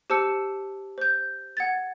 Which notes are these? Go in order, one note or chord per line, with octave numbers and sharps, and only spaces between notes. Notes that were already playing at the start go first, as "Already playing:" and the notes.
G4 C5 A5 E6 C#7
C5 G6
F#5 G#6 A6